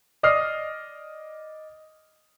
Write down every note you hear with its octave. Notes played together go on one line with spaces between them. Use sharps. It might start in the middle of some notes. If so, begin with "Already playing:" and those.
D5 D#5 D#6 F6 C7